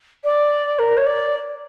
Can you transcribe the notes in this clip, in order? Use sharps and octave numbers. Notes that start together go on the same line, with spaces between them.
D5
A#4
C#5
D5